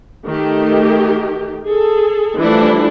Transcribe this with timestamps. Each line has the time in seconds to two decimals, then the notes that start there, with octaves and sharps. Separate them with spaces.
0.25 D#3 A3 G4
1.68 G#4 A4
2.39 E3 F3 G3 A3 D4 E4